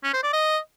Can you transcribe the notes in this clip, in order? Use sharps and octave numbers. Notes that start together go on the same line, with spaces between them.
C#4
C5
D5
D#5